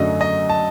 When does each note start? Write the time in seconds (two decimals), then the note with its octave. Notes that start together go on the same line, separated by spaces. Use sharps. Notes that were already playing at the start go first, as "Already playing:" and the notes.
Already playing: F#2 D3 F#3 A3 D4 D#5
0.21 D#5
0.50 A5